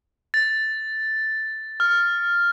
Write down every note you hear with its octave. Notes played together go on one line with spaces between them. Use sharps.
A6
F6